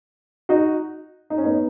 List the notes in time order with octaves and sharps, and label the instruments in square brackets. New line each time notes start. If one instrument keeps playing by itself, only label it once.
[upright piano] D#4 F#4
D#4
C#4
B3 D#4